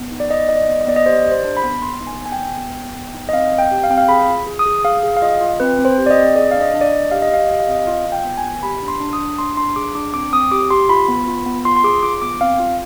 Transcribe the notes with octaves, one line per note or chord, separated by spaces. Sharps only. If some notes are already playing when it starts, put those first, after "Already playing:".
Already playing: B3
D#4
D5
B3 D#5
D#4 D#5
D5
B3
D#5
B3 D5
D#5
G4 C5
G4 D5
C5
D4
B5
B3
B3 C6
D#4
G#5
B3
G#5
G5
B3
B3
B3
B3
D#4
D#5
C4 F5
C4
G5
G4
F5
C4 G5
F5
G#4 B5
F4
G#4
D#6
G#4
G#4 F5
G#4
F5
F4 D#5
F4
C4 B4
C4
C5
G4
D5
D#5
C4
G#4 D5
D4 F5
D#5
D4
D5
D#5
D4
G4 F5
D#5
G4 F5
G4 D#5
F5
C4 D#5
F4 F5
F4
G5
B3
G#5
B3
G4 B5
D4
C6
D4
D#6
D4
D4 C6
D4 C6
G#4 D6
D4 D6
C4 D6
C4 D#6
G4 D6
G4 C6
F4 B5
B3
F4
B3
F4 C6
C6
G#4 D6
F4 D6
B3 D6
C4 F5
F4